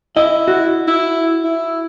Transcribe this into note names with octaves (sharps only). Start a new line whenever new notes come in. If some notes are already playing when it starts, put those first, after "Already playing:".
E4 D#5
F#4
E4
E4